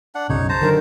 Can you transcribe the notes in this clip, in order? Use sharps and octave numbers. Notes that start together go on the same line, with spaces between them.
D4 F#5
B1 F#2 C#3 D#4 C#5
C5 A5 A#5
D3 D#3 F#3 A#4